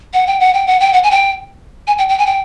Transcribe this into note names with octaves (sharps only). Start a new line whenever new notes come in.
F#5
G5
F#5
G5
F#5
G5
F#5
G#5
G5
G#5
G5
G5
G#5
G5